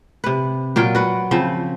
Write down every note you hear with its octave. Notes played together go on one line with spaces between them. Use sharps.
C3 B4
A#2 F#3 F4 G5
F#4 B4
C#3 F3 C4